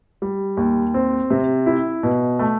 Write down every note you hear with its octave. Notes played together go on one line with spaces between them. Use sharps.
G3
D#2
C4
C3
E4
B2
A3